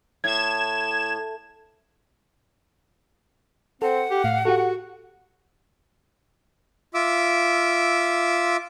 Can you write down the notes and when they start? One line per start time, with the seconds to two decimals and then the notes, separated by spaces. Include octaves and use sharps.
0.24 A2 G#6 E7
3.82 C4 A4 F#5
4.11 G4
4.24 A2 F5
4.45 F#4 G4 A4
4.57 F#4
6.94 F4 E5 D6 E6